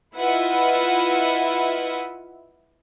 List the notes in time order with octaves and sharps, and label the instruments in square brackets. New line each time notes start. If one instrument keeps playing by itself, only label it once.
[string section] E4 F4 B4 D#5 E5 F#5